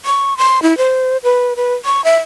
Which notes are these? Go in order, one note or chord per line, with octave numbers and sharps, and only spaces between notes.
C#6
C6
E4
C5
B4
B4
C#6
E5